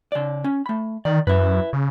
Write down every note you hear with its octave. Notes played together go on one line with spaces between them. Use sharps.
C#3 D5
C#4
A3 B5
D#3 D5
F#2 E4 B4
C#3